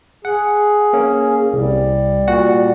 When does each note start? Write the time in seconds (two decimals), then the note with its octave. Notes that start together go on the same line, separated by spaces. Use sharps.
0.25 G#4 F#5
0.93 A#3 C#4
1.53 C2 G3
2.28 A#2 F#4 F#5